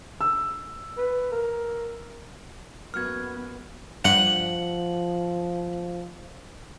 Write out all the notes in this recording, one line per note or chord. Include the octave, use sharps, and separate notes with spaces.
E6
B4
A#4
F#2 A#3 B3 F#4 F6 G#6
G2 F3 F#5